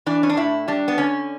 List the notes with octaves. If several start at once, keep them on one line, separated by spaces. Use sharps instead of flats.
E3 D4
C#4
D4
A2 E4
G3 D4
B3
D3 C#4